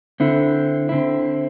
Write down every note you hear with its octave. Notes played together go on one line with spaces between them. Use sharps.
D3 C4 E4
D3 C4 E4